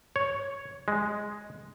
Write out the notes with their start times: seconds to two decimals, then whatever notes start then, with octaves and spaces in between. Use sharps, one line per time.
0.16 C#5
0.88 G#3